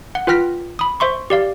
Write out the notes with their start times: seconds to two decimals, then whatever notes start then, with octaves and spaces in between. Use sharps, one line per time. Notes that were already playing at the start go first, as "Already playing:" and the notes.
0.15 F#5
0.27 F4 B4 G5 F6 A#6 B6
0.79 B5 D#6
1.00 C5 E5 C6 C#6
1.30 G4 D5 F5